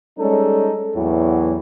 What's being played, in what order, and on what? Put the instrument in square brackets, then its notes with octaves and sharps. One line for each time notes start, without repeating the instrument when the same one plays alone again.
[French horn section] G3 G#3 C#4 [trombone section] D#4 A4
[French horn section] E2 [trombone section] A2 E3 F#3